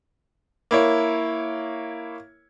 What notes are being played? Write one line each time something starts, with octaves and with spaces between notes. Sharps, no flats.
A#3 E4 C#5